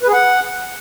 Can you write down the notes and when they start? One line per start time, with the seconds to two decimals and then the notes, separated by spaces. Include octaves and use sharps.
0.03 B4
0.08 G#4
0.13 F#5